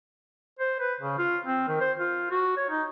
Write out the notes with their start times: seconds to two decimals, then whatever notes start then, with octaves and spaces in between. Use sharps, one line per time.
0.59 C5
0.80 B4
1.00 C#3
1.18 F4
1.46 C4
1.68 D#3
1.80 C5
1.99 F4
2.31 F#4
2.57 C#5
2.70 D#4